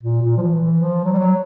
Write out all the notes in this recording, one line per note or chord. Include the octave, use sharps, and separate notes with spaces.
A#2
A#2
F3
E3
E3
F3
F#3
G3
F#3